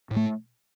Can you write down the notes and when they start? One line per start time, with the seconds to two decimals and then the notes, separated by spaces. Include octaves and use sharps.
0.11 A2
0.16 A3